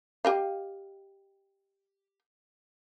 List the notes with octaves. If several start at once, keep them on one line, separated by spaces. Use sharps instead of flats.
G4 D#5 F5